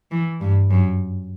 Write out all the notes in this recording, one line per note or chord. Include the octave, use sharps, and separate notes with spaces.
E3
G2
F#2